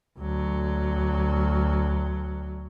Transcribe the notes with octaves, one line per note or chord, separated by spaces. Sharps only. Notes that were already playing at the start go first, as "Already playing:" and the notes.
D2 F#3